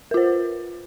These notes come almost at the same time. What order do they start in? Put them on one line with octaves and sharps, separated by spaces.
A#4 F4 C5